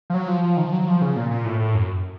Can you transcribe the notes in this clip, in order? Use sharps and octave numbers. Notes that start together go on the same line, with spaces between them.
F3
F#3
F3
F3
D#3
F3
F#3
F3
C#3
A#2
A#2
A2
A2
F#2